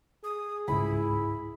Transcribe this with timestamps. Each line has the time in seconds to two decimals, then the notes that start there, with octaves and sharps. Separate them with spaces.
0.24 G#4 D#6
0.68 C#2 G#2 E4 B5